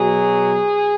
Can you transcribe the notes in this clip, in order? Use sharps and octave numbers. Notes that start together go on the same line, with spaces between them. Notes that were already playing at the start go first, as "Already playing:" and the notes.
Already playing: B2 F#3 G#4